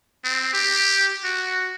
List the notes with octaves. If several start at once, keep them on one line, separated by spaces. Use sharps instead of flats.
C4
G4
F#4